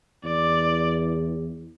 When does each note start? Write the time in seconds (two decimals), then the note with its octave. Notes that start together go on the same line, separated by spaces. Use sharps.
0.24 E2 D5